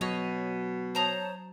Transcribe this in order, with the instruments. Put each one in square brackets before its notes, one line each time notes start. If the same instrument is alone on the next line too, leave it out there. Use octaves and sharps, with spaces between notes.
[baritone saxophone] B2 [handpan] F#3 [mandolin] C#5 D#5
[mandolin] C5 A#5 D#6 [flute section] C#5 A5